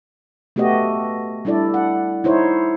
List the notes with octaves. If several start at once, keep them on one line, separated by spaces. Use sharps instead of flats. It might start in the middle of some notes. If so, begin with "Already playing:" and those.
A3 B3 F#4 G4 D#5
G3 D4 E4 A4 D5
F#5
D#4 E4 C5 C#5